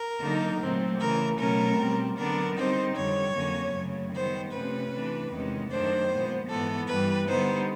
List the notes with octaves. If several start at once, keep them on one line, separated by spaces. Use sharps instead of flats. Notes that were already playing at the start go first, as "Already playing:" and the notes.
Already playing: A#4
D3 F#3 A#3 D#4
A#2 F#3 A3 C4
C#3 E3 A3 A#4
B2 F#3 A3 C#4 A#4
B2 G3 C4
D3 F#3 B3 D4 A#4
D3 G3 C4 D#4 C5
F2 D3 G3 C#5
F2 D3 F#3 A#3 C#4
F#2 C#3 F#3 A3
D#3 G3 B3 C5
C3 F3 A3 C#4 B4
C3 E3 A3 D4
E2 C3 D#3 G#3 C#4
F#2 D#3 F#3 A3 D4 C5
A#2 F3 G#3 B3
G#2 E3 G#3 B3 A4
G2 E3 G3 B4
D3 G3 B3 D#4 C5